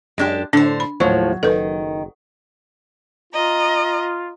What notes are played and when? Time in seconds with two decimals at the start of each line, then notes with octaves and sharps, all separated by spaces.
0.18 F#2 G#3 D4 G4
0.53 A2 D3 D4 C5
0.80 B5
1.00 D#2 A2 F3 F#3
1.43 F#1 D#3 A4 B4
3.33 F4 D#5 A#5